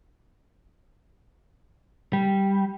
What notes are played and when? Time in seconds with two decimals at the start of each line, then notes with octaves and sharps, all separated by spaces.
2.13 G3